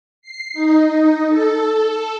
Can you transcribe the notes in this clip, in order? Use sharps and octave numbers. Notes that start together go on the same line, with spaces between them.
C7
D#4
A4